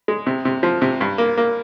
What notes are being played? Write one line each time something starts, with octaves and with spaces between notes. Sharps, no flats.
G#3
C3
C3
F3
C3
G2
A#3
A#3